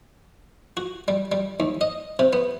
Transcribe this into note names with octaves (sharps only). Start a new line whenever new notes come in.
F#4
G3
G3
D#2
D#5
C3
B3